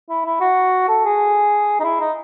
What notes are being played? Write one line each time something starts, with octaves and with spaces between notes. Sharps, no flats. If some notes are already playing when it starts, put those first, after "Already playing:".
E4
E4
F#4
A4
G#4
D#4
E4
D#4